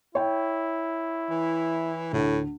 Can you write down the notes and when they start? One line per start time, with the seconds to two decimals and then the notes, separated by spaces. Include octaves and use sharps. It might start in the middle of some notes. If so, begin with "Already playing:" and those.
0.15 E4 C#5 G5
1.30 E3
2.13 D2 A2